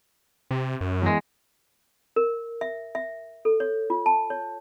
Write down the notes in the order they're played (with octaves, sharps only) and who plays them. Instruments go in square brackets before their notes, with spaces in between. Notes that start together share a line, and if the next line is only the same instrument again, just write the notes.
[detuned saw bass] C3
F#2
[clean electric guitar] E2 G#3
[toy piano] A#4
E5
E5
A4
C#5
F4
A5
C#5